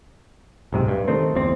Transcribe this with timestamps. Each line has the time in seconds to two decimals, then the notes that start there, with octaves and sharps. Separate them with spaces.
0.73 B1 G#2 C3
0.88 G2
1.08 D#3 A3 C4
1.34 G1 E2 C4